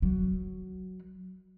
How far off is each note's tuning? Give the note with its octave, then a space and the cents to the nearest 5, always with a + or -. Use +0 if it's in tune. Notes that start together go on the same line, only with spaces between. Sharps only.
F#3 +5